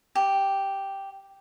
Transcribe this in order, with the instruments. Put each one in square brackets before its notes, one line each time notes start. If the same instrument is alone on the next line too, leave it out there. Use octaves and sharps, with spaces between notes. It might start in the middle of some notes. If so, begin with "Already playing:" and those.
[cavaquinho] G4